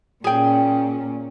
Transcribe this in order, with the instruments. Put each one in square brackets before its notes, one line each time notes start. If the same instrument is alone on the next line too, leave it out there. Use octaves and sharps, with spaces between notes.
[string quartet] A#2 C#4 [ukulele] G#4 G5